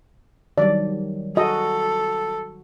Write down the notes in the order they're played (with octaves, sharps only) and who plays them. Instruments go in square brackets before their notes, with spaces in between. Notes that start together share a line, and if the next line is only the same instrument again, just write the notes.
[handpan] D#3 F#3 G3 [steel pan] D5
[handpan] F#4 [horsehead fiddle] A4 [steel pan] D#5